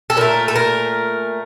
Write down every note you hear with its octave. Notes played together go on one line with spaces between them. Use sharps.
A4
A#2 A3 A#4
A4
A#4